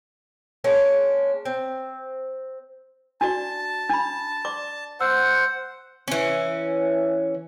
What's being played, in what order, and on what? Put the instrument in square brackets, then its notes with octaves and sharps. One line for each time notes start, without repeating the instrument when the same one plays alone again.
[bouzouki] G#3 A#3 C#4 D4
C4
[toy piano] D4 F#4 D5 [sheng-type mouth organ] A5
[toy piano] D4 B5
D5 C6 D6
[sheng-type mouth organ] C5 F#5 [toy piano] E6
[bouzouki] E3 C#4